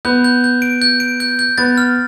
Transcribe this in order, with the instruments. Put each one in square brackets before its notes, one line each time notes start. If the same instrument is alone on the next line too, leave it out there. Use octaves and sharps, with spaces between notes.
[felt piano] B3 [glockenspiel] G6
[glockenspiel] G6
G6
D7
G6
D7
G6
G6
[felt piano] B3 [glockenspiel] A6
[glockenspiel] F6